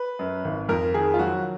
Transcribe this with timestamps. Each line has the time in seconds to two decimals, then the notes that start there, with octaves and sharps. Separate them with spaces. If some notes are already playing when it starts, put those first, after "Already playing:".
Already playing: B4
0.19 F#2
0.45 G#1
0.69 F2 A#4
0.94 D#3 G#4
1.14 F4
1.19 F#3 F#4